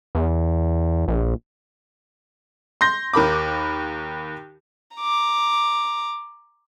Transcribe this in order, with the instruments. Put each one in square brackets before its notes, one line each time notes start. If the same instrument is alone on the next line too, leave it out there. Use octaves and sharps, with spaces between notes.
[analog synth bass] E2
A#1
[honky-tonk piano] C6 G6 A#6
D#2 A#4 B5 D6
[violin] A#5 D6